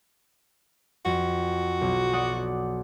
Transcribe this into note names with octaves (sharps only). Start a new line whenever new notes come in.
F2 F#4
B1
D5 F#5 D#6